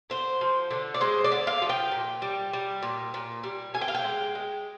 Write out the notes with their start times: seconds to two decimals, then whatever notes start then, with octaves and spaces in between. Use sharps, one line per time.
0.10 D3 C5
0.41 F3
0.71 D3
0.94 D5
1.01 G#3 C5
1.24 D5
1.32 D3
1.47 F5
1.62 F3
1.69 G5
1.92 A#2
2.22 G3
2.53 G3
2.82 A#2
3.14 A#2
3.43 G3
3.74 D3 G#5
3.81 G5
3.88 F5
3.95 G5
4.04 G#3
4.35 G#3